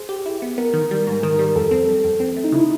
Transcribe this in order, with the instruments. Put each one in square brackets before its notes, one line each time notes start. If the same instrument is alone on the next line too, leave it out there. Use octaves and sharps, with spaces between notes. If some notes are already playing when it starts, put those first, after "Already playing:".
Already playing: [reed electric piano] G#4 [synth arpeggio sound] C5
[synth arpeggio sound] G4
E4
B3
[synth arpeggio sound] B3 [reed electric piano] A#4
[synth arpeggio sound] D#3
G3
G#2
[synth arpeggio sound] D#3 [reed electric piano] A#4
[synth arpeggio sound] G3
[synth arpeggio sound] F2 [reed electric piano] A4
[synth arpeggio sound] C4
G3
F2
C4
A3
[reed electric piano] D#4
[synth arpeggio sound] C#3 [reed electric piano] E4